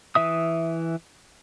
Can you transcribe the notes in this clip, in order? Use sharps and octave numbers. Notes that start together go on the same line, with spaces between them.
E3 E5 D#6